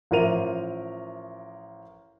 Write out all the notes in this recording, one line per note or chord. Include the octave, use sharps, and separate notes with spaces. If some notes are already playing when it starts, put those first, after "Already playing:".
A1 F3 A#4 E5 D#7 F7